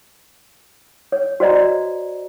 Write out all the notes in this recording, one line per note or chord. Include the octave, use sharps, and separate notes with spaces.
C#5
F#4 C5 D5 D#5 A#5